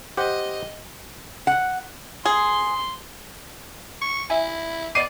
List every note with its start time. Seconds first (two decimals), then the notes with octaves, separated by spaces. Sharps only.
0.17 G4 C5 D#5 F#5
1.47 F#5
2.25 G#4 C6
4.02 C#6
4.30 E4 E5 G#5
4.95 B3 D5 D#5 D6 C7 D#7